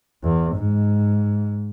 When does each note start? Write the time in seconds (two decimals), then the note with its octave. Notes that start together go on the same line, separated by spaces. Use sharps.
0.23 E2
0.56 G#2